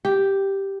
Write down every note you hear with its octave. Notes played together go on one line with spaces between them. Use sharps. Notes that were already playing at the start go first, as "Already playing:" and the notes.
G4